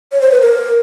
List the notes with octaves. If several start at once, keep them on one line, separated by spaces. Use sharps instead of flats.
C#5
C5
B4
A#4